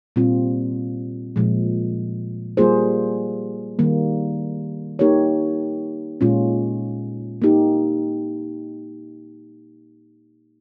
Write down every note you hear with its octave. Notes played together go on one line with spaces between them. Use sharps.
A#2 G3 C4 F4
A#2 F3 G#3
G3 A#3 F4 G#4 C5
D#3 G3 A#3
A#3 D#4 G4 A#4 C#5
A#2 G#3 C#4 F4
A#3 D#4 G4